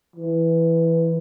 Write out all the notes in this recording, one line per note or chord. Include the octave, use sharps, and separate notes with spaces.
E3